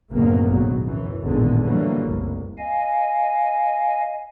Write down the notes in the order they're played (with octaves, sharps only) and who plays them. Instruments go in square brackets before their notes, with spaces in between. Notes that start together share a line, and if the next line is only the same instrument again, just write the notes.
[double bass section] F#1 D2 A2 C3 A#3 B3
G#1 B2 F#3
F#2 E3
A1 E2 A#2 D3 D#3 G#3
D3 E3 F#3 G3 A3 A#3
F#1 C2
[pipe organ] D#5 F5 G#5